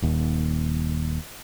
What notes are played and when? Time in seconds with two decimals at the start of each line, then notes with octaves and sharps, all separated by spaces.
0.02 D#1 D#2